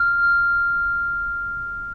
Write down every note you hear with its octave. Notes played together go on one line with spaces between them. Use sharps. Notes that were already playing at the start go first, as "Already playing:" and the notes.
Already playing: F6